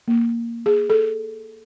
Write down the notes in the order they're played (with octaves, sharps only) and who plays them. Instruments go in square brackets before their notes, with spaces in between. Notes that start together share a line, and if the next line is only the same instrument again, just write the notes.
[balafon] A#3
G#4
A4